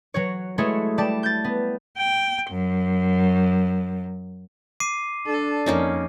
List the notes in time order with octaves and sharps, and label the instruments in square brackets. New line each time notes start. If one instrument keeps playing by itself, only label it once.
[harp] F#3 F#4 C#5
G#3 A3 E4 F#4 G#4 C#5
G3 D5 A5
G6 A6
B3
[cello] G5
F#2
[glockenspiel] D6 C7 D#7
[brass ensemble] D4 [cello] A4
[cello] F2 [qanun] A#3 C#4 D#4